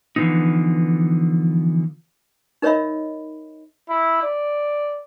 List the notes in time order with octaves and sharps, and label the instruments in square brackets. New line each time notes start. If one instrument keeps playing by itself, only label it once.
[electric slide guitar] D3 E3 F3 B3 D#4
[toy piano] D#4 A#4 C#5 D#5 E5 B5
[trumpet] E4
D5